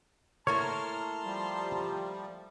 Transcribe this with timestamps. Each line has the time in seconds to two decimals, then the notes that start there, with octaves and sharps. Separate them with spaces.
0.47 A3 A#3 E4 C#5 A5 A#5 C6 F6
1.24 F3 G3